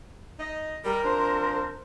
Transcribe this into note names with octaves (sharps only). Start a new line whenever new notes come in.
D#4 D#5
G3 A#4
F3 C4 D4 C5